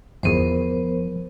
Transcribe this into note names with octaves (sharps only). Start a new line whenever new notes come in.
G1 E2 F3 B3 A#4 C5